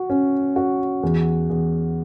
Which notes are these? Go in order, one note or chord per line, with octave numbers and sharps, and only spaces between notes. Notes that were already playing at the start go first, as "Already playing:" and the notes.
Already playing: F#4
C#4
F#4
E2
E2